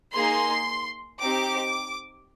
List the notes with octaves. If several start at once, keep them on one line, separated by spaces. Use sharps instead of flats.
A#3 D#4 G#4 C6
C4 D#4 G4 D6